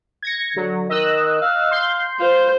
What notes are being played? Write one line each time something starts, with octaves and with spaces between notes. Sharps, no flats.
G#6 A#6 C#7
D3 F#3
D#3 D#5 E6 F#6
F5
C6 G6
F4 C5